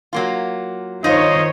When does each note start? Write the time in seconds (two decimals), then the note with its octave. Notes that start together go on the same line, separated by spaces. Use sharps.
0.13 F#3 A#3 F4
1.04 D#3 D#4 F4 C5 C#5 D#5